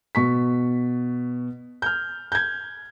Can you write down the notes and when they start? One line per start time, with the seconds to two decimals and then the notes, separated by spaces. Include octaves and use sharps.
0.15 B2 C#6 B6
1.82 F6 G6
2.32 G6 G#6